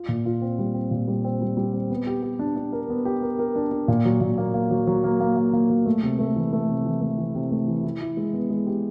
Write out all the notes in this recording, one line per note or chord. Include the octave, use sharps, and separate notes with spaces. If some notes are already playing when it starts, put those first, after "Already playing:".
Already playing: F4
A#2
F4
C4
G3
C4
A#2
G3
C4
G3
G3
C4
B3
G4
G4
D4
D4
A#4
B3
G4
A#4
A#4
D4
D4
A#2
F#3
A#2
A#3
A#3
F#3
F#3
A#3
A#3
A#3
A#3
F#3
A3
C3
A3
E3
A3
C3
E3
A3
E3
C3
A3
E3
E4
E4
G#3
B3
G#3
G4